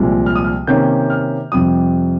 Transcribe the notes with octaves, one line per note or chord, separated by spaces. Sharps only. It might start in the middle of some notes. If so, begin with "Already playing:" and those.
Already playing: C2 A#2 F3 G#3
F6
D#6
F6
C3 D#3 A#3 C#4 G6
F6
F2 C3 G3 D#6